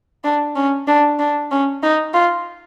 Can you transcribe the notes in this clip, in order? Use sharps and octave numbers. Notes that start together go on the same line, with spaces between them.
D4
C#4
D4
D4
C#4
D#4
F4